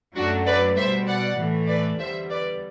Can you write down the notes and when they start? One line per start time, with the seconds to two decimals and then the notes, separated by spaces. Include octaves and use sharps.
0.16 F#2 F#3 A3 D4 F#4
0.46 B4 D5
0.77 B2 G3 C5 E5
1.08 D5 F#5
1.39 A2 E3 A3
1.69 B4 D5
2.00 E2 D3 G3 C5 E5
2.30 B4 D5